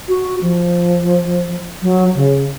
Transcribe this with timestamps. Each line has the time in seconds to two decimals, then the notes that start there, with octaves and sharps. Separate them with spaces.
0.08 F#4
0.41 F3
1.82 F#3
2.15 C#3